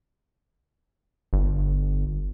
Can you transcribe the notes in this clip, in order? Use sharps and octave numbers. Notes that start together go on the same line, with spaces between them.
G1